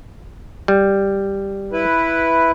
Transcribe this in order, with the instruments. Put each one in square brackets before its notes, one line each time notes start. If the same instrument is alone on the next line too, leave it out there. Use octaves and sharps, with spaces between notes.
[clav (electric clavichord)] G3
[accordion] E4 B4